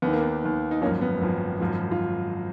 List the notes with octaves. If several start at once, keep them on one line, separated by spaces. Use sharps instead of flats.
D#2 D#3 B3
A#3
B3
D#2 D#3
D#4
G#1 F#2 F3 A#3 C#4
B3
G#1 F#2 F3
G#1 F#2 F3
F4